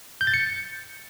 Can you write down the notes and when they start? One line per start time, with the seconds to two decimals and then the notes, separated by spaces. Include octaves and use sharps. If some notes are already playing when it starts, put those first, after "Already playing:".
0.21 G6
0.27 A6
0.34 C#7